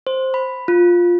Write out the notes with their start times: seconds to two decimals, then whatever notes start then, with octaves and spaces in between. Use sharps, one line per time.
0.07 C5
0.34 B5
0.68 F4